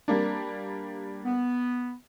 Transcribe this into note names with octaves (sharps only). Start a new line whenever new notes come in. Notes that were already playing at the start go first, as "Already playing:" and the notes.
G3 A#3 D4
B3